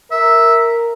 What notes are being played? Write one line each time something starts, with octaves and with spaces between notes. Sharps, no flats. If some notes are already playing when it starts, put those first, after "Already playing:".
A#4 E5